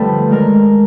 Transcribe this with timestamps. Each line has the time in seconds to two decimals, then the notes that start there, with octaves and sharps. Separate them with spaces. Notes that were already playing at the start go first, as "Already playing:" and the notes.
Already playing: G2 D3 F3 A3 A4 B4 G5
0.29 D#3 G#3 A#4